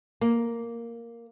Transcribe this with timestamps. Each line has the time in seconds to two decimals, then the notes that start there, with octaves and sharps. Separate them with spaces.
0.21 A#3